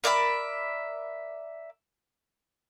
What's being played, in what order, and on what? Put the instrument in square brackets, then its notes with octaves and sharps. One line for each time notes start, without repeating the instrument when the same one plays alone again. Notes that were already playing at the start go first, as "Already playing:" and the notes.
[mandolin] A#4 D5 E5 B5